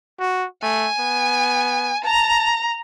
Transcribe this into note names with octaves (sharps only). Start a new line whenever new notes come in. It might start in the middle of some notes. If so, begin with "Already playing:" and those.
F#4
A3 G#5
B3
A5 A#5